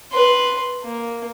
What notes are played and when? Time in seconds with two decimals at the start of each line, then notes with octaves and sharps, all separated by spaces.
0.12 B4 C6
0.83 A#3